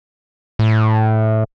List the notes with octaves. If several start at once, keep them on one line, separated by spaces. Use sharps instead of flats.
A2